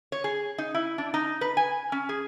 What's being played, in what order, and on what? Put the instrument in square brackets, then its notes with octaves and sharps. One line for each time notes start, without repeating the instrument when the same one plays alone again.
[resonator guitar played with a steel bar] C#5
G#4
D#4
E4
D4
D#4
B4
G#5
C#4
G#4